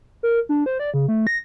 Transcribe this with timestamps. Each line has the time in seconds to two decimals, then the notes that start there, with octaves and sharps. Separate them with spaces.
0.23 A#4
0.49 D4
0.66 C5
0.79 D5
0.94 C#3
1.08 A3
1.27 A#6